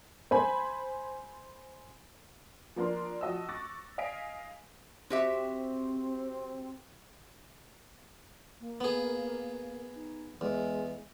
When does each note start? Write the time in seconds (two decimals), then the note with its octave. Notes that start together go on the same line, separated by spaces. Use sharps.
0.31 C5 G#5 B5
2.76 F3 A#3 D4 A#4 C6
3.21 F3 F#4 D#5 A5 E6
3.49 C#6 D6 F#6 A6 A#6
3.98 D#5 F5 G#5 B6 D7
5.10 C4 F#4 G4 E5
8.60 A#3
8.81 B3 G#4
9.95 D#4
10.41 E2 G#3